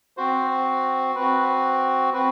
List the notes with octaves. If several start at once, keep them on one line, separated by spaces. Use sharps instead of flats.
C4 F#4 C5
C4 F#4 B4
C4 F#4 B4